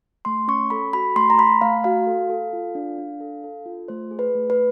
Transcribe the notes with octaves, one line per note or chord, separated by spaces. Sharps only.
A3 C6
C#4 C#6
A4 B5
F#4 B5
A3 C6
A#5
A3 B5
A3 F5
F#4 F5
A4
A4
F4
D4
D4
A4
A4
F4
A3 C5
G#4
B4
A3
B4